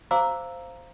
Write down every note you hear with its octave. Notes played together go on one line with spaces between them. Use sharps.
C5 F5 A#5 D6 E6